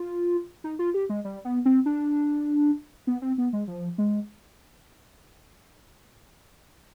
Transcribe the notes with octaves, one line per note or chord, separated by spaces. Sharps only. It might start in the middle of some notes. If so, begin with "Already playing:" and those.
Already playing: F4
D#4
F4
G4
G#3
G3
B3
C4
D4
B3
C4
B3
G#3
F3
G#3